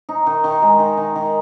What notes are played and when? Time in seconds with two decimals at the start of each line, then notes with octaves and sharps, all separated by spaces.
0.09 D#4
0.27 D#3
0.44 D#3
0.62 G#3
0.79 D#3
0.97 D#3
1.15 D#3